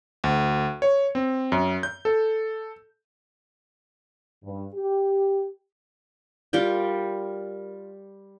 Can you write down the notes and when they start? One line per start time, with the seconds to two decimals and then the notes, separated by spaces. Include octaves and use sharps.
0.24 D2
0.82 C#5
1.15 C4
1.52 F#2
1.83 G6
2.05 A4
4.44 G2
4.74 G4
6.53 G3 F4 A#4 G5